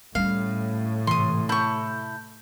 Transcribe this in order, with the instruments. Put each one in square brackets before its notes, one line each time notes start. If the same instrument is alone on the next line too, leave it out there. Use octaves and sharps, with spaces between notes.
[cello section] A2 [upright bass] G3 C#4 [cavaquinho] F5
[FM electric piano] G#2 E3 [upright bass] C3 [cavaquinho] C6 D#6
[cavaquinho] E4 C#6 [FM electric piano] A5 G6